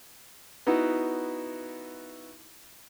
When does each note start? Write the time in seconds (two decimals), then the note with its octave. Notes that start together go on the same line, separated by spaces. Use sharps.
0.67 B3 D#4 E4 F#4